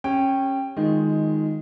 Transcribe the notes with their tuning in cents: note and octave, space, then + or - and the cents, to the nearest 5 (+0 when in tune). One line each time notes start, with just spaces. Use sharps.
C#4 -20 G4 +15 G5 +0
D#3 +10 G#3 +0 F4 +0